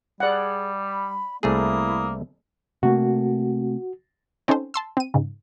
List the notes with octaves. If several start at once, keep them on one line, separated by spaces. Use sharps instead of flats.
G3 G#4 D5 F#5
B5
C2 A3 A#3 E4 G#4 D#6
C3 A3 A#3 F#4
C4 C#4 D#4 A4 C5
A5 C6 E6
C4 D#7
G#2 C#3